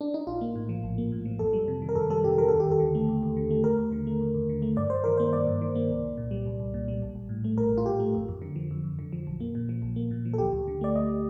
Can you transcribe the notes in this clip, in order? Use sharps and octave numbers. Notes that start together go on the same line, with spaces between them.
D4
D#4
A#1 F4
A#3
A2
F3
A#1
A#3
A2
F3
F2 A4
G3
C3
D#3
A#4
F2 A4
G3 A4
C3 G4
D#3 A#4
D#2 A4
G4
D#2
A4
D3
A3
D#2
D#2
D3
A3
D#2 A#4
D#2
D3
A3
D#2
D#2
D3
A3
G2 D5
G2 C5
D#3 A#4
A#3 C5
G2 D5
G2
D#3
A#3
C2
C2
A#2
G3
C2
C2
A#2
G3
A#1
A#1
A2
A3
A#1 A#4
A#1
F4
A2 G4
A3
F2
F2
D3
F3
F2
F2
D3
F3
A#1
A#3
A#2
F3
A#1
A#3
A#2
F3
A4
D2 G4
D2
D3
A3 D5
D2 D#5